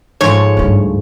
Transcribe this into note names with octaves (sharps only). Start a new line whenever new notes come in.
G#2 F3 A3 C#5
D2 G2